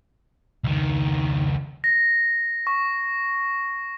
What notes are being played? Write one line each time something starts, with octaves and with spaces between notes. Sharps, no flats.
C#2 D#3
A#6
C#6